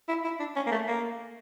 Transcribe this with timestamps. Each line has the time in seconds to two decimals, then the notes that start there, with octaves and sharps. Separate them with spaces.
0.09 E4
0.24 E4
0.40 D4
0.56 C#4
0.67 A#3
0.72 A3
0.87 A#3